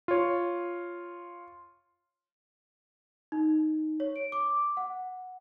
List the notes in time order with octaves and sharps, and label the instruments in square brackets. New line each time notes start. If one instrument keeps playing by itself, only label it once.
[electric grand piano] F4 C#5
[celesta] D#4
C#5
D7
D6
F#5